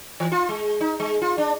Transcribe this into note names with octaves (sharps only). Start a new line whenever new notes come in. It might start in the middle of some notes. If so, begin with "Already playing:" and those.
E3
F4
G#3
D#4
G#3
F4
D4